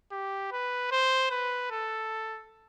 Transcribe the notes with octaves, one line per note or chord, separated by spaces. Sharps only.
G4
B4
C5
B4
A4